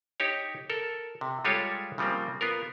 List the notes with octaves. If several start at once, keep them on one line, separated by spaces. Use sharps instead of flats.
D#4 G4 C#5
A4 A#4
C3
G3 G#3 F4 G4 A4 C#5
C#3 F3 G3 A#3 C4
B3 F4 A#4